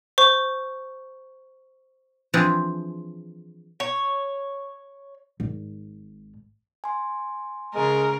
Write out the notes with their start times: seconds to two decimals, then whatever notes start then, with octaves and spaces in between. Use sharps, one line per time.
0.18 C5 C#6
2.34 E3 F3 C4 D4 G#4
3.80 C#5
5.40 G#1
6.84 G#5 C6
7.75 C#3 G#3 A#4